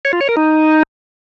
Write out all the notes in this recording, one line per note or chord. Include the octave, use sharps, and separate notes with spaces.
C#5
F4
C#5
A#4
D#4